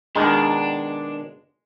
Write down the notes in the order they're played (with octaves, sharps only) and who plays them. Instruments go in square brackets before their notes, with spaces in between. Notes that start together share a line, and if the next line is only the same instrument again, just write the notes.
[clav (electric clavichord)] B2 D#3 [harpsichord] G#3 [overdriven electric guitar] D4